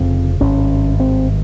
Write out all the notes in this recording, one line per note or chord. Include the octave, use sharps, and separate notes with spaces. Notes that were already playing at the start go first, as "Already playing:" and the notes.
Already playing: F1 F2 C#3 C4
G#1 G2 C#4
C4